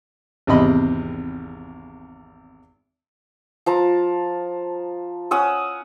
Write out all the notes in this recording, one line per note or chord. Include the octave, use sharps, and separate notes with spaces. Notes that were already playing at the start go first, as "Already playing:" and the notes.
G#1 E2 C3 C4 D#5 B5
F3 A5 A#5
C#4 F#5 D#6 E6